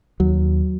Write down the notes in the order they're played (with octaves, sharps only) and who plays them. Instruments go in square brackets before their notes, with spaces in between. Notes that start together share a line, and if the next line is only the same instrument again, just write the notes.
[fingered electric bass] D#2 F#3